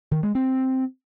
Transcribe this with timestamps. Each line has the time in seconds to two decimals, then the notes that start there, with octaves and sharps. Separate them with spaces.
0.11 D#3
0.23 G#3
0.35 C4